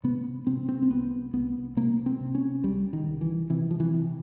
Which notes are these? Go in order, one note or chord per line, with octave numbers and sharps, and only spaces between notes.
C3 B3
C3 C4
C4
C4
C2 B3
C2 B3
C3 A#3
C4
C3
C#4
C2 G3
D#3
C2
E3
C3 E3
F3
E3
C3